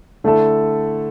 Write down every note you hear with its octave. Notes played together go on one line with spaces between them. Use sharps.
D3 A3 E4 A4